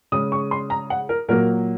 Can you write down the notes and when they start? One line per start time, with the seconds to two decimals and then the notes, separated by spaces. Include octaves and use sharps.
0.12 C#3 G#3 C#4 D#6
0.32 C#6
0.51 C6
0.70 A#5
0.90 F#5
1.09 A#4
1.28 A#2 F#3 A#3 A#4